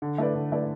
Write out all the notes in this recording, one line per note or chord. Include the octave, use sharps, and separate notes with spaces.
D3
A3 E4 B4 D5
D3
A3 E4 B4 D5